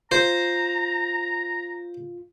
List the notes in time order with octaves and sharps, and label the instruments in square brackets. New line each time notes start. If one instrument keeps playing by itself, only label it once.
[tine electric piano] F4 [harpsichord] C5 [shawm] A#5